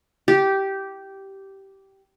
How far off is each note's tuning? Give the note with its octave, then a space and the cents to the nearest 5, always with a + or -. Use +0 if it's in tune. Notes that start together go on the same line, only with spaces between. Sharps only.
G4 -10